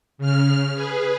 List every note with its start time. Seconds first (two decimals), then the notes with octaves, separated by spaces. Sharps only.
0.18 C#3 F6
0.74 G#4 B4